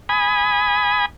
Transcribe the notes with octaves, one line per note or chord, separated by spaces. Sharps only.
G#5 B5 D#6